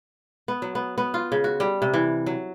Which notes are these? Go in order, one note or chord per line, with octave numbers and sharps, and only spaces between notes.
B3
F#3
B3
B3
F4
C#3
F#4
G3
C3
E3
F#3